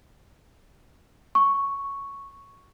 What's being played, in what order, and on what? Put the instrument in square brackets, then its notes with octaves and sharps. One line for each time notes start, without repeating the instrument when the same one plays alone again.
[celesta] C#6